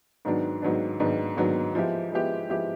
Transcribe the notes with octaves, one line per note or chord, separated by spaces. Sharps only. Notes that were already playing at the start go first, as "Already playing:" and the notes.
G#2 D#3 F#3 B3 D4
G#2 D#3 F#3 B3 D4
G#2 D#3 F#3 B3 D4
G#2 D#3 F#3 B3 D4
F3 G#3 B3 E4 G4
F3 G#3 B3 E4 G4
F3 G#3 B3 E4 G4